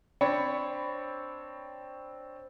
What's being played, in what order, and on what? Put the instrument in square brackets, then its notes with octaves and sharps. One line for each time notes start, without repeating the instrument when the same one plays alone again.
[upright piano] C4 D4 C#5 B5 C#7